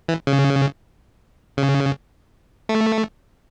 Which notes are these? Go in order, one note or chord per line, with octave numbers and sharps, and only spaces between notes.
E3
C#3
C#3
A3